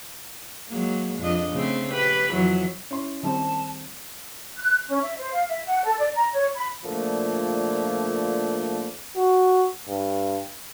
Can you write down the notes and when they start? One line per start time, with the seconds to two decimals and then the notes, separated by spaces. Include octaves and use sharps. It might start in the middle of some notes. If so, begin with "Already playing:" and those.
0.69 F#3 G#3 A#3
1.20 F2 D4 D#5
1.52 C#3 A3 C4
1.92 G4 B4
2.31 F2 E3 F#3
2.91 C#4 E4 C6
3.23 D#3 G3 C4 A5
4.58 F#6
4.88 C#4
5.02 E5
5.18 C5
5.33 F5
5.48 E5
5.66 F#5
5.84 A4
5.98 D5
6.15 A#5
6.34 C#5
6.55 B5
6.85 A#2 D3 F3 A3 A#3
9.16 F#4
9.88 G2